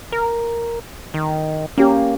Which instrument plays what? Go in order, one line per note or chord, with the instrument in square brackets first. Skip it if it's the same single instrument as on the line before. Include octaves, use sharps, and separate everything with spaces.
[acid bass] A#4
D#3
[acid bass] A#3 [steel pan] C#4 G4